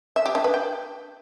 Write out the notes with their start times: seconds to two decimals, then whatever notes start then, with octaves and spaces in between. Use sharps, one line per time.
0.16 E5
0.26 G4
0.35 D4
0.44 B4
0.54 G5